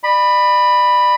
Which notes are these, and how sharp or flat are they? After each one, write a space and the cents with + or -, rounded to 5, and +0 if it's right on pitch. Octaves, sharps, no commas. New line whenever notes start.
D5 +40 B5 +0